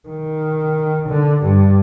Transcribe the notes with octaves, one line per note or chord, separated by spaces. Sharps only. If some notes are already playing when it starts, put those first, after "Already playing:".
D#3
D3
G2